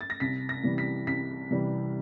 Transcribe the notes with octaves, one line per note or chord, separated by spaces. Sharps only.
A6
A#6
C2 B6
A#6
C3 E3 G3
B6
C2 B6
C3 E3 G3